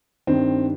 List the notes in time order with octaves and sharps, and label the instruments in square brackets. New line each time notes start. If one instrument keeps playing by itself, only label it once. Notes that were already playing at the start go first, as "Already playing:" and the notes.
[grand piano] G2 D#3 C4